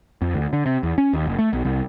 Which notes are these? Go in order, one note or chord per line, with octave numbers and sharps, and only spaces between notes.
F2
D2
D3
C3
E2
C#4
D#2
F#1
A3
B1
C2